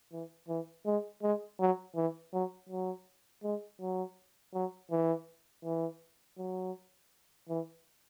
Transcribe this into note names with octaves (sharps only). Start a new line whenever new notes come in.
E3
E3
G#3
G#3
F#3
E3
F#3
F#3
G#3
F#3
F#3
E3
E3
F#3
E3